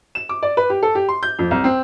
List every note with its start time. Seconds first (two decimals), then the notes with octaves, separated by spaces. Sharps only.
0.15 E7
0.29 D6
0.43 D5
0.57 B4
0.70 G4
0.83 A4
0.95 G4
1.09 C6
1.23 G6
1.39 F2
1.51 C2
1.64 C4